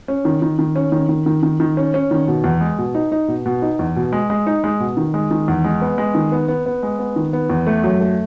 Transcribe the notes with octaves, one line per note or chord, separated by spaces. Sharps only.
C#4
D#3
D#3
D#3
C#4
D#3
D#3
D#3
D#3
D#3
C#4
C#4
D#3
B2
E2
G#3
B2
D#4
D#4
B2
B2
D#4
E2
B2
G#3
G#3
D#4
G#3
B2
D#3
G#3
D#3
E2
G#3
B3
G#3
D#3
B3
B3
B3
G#3
B3
D#3
B3
E2
A3
F#2
A3